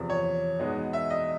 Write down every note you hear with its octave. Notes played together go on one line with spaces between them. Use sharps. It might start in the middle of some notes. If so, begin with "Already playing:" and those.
Already playing: E2 C3 F3
C#5
E2 B2 G#3 B3 D#4
E5
D#5